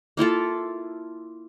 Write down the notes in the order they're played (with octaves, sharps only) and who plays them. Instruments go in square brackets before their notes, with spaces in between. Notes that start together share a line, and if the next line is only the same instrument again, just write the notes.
[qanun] A#3 E4 F4 A4